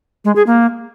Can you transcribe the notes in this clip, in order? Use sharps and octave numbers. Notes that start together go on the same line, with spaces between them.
G#3
G#4
A#3